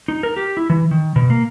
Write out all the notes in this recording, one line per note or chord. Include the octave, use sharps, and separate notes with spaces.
D#4
A#4
G4
E4
E3
D#3
B2
A#3